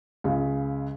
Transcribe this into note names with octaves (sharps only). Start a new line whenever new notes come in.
C#2 C#3